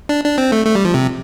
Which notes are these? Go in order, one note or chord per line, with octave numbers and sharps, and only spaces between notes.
D4
D4
C4
A3
A3
G3
F3
C3